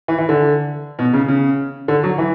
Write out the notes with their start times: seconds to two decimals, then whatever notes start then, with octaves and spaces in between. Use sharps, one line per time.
0.08 E3
0.18 E3
0.29 D3
0.99 B2
1.13 C#3
1.28 C#3
1.88 D3
2.03 F#3
2.18 E3